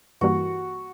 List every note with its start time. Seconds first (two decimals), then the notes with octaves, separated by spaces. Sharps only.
0.21 G2 E3 G3 A#3 F#4